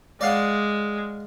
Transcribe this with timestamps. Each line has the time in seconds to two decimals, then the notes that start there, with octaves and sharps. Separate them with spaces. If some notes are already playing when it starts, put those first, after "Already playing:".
0.21 G#3 D5 F5 F#5